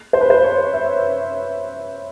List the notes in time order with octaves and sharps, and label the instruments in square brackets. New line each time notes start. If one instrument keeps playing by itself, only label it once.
[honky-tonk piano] C5
B4
C5
C#5
E5